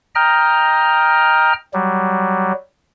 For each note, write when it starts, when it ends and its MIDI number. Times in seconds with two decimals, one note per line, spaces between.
0.15 1.53 75
0.15 1.53 79
0.15 1.53 82
0.15 1.53 89
1.74 2.52 54
1.74 2.52 55